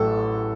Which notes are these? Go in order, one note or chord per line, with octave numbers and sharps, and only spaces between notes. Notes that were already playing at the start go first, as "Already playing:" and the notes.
Already playing: A1 A2 F#3 A4